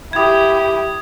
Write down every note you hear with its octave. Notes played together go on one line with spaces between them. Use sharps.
E4 G4 D#6 G#6